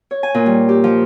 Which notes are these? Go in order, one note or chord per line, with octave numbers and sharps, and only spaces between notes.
C#5
G#5
A#2
G3
G4
F3